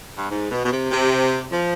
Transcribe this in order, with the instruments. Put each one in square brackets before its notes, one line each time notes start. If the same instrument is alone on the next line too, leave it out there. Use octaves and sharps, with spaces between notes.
[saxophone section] G2
G#2
B2
B2
C3
C3
F3